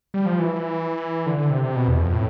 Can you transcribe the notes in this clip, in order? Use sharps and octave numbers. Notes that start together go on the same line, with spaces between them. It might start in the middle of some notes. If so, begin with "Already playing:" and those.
G3
F3
E3
D3
D3
C3
C3
B2
E2
F2
A2